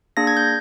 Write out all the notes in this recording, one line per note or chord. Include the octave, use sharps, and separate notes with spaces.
A#3 D4 G#4 A#6
G#6
G6